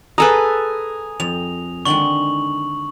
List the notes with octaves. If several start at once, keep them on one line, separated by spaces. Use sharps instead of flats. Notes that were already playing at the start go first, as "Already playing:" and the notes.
G#4 A4 B4 G#5 A#5 D#6
F2 F7
D3 D#3 G#3 C#6 F#7